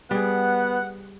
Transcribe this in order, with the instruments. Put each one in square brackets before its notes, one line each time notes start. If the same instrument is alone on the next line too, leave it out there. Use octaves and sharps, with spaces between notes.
[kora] G3 G#4 [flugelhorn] B3 [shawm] F#5